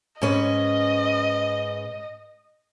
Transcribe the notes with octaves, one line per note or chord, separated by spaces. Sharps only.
G#2 C#4 B4 D#5